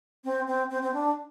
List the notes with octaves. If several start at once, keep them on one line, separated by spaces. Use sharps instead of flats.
C4
C4
C4
C4
D4